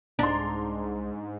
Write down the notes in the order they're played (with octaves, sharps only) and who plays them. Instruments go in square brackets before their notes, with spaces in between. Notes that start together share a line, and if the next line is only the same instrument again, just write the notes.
[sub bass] C2 [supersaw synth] G#2 [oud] D4 [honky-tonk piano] A#5 C6